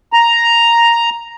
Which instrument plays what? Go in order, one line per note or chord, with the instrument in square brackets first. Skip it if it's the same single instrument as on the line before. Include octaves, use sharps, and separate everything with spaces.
[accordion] A#5